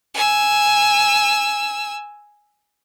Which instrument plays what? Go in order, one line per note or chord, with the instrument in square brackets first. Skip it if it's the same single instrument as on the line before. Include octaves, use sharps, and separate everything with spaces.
[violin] G#5 E6